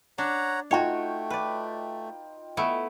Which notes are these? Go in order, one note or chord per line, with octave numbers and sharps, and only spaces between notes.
D4 C#5 F#5 A#5
A3 D#4 F4 F#4 C#5 G5
B4 D5
A3 B3 E4